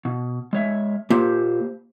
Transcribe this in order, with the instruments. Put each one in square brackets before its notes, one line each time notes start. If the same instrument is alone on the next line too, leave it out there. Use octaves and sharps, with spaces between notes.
[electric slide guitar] B2
G#3 C#5 E5
[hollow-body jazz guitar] A#2 [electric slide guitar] A#3 G4 C5